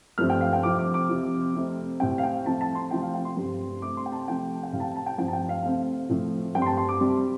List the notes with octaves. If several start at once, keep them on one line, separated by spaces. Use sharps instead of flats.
G2 F3 A3 C4 F6
G5
F5
G5
F2 C3 F3 C4 D6
D6
D6
F2 C3 F3
F2 C3 A3 C4
A2 G3 C4 G5
F5
G5
F2 F3 A3 C4 A5
A5
C6
C3 F3 A3 C4 G5
F5
G5
C6
G2 G3 C4
C3 A3 C4 D6
C6
G5
A5
C3 F3 A3 G5
G5
A2 G3 C4 F5
A5
G5
A5
G5
G2 F3 C4 G5
A5
G5
F5
C3 A3 C4 F5
A2 F3 A3 C4
G2 G3 C4 G5
C6
A5
C6
D6
C3 G3 C4